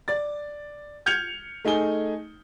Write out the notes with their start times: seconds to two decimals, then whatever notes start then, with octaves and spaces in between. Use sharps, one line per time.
0.08 D5 A6
1.06 F6 G6 G#6 C#7 F7
1.65 A3 D#4 G#4 G#5 G7